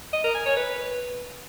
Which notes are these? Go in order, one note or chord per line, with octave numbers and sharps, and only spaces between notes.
D#5
A#4
G#5
C#5
B4